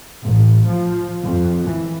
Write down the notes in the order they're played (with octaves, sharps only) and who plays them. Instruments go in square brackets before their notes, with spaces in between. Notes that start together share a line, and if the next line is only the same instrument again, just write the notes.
[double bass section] A1
F3
F2
E3